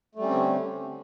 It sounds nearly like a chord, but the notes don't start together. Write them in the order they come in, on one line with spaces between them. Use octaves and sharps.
A3 G3 C#4 C4 D3